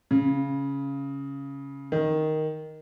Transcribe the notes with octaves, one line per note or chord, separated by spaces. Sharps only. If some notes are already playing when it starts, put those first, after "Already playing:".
C#3
D#3